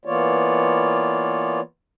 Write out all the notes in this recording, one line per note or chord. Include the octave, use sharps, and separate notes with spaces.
E3 A#3 B3 F4 C#5 D5